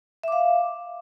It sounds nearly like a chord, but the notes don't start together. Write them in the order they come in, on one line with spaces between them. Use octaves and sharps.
E5 D6 F5